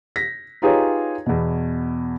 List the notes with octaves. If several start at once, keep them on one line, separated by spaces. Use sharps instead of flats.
A#6 B6
D#4 F4 G4 G#4 B4 C#5
E2 B2